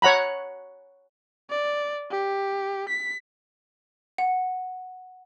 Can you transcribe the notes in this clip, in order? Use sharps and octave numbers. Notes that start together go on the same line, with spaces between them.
C#5 F#5 A#5 B5
D5
G4
B6
F#5